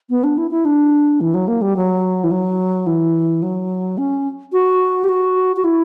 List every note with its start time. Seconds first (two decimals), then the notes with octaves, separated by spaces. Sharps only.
0.10 B3
0.24 D4
0.38 E4
0.51 E4
0.65 D4
1.21 E3
1.34 F#3
1.48 A#3
1.62 G3
1.76 F#3
2.24 E3
2.31 F#3
2.87 E3
3.42 F#3
3.98 C#4
4.53 F#4
5.04 G4
5.09 F#4
5.56 F#4
5.64 E4